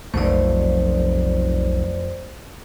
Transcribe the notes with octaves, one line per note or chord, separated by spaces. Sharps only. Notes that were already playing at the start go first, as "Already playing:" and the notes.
F1 B1 F2 A3 C5 D5